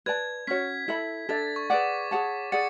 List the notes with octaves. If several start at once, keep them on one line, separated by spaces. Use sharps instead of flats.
B4 D5 A5 G#6
C#4 F#4 C#5 B6
E4 A4 E5 B5
D4 A4 E5 A6
C#6
G#4 B4 D5 F#5 D6
G#4 C#5 F#5 A5
G#4 D5 F#5 A6 C#7